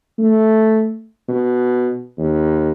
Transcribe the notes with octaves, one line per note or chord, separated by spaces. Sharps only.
A3
B2
D#2